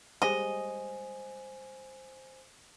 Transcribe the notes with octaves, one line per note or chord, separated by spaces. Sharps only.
G3 G#3 C5 D#5 G#5